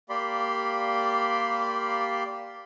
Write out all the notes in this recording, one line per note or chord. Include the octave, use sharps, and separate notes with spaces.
A#3 G4 D5 B5 C6